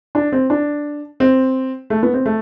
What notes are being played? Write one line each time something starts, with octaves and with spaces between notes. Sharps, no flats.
D4
C4
D4
C4
A3
B3
C4
A3